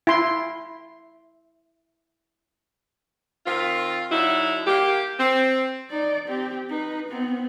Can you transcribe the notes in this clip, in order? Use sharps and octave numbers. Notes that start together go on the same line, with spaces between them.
E4 C6
D#3 C4 F4
D3 F#3 D#4 E4
A#3 G4
C4
D#4 D5
C4 G4
D#4 B4
B3 C4